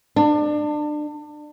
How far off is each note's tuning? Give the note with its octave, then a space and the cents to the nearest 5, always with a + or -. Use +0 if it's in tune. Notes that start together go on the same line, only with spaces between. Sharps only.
D4 +30